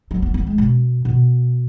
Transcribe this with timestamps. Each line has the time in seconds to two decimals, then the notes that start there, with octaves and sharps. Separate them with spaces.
0.11 F#3
0.22 B3
0.34 B3
0.47 G#3
0.58 B2
1.05 B2